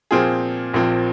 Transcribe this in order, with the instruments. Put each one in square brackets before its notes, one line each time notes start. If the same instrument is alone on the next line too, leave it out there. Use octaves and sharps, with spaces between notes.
[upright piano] A#2 F3 C4 F4 G#4
A#1 A#2 F3 C4